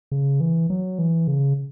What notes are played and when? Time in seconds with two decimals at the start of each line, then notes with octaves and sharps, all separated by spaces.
0.12 C#3
0.40 E3
0.70 F#3
0.99 E3
1.27 C#3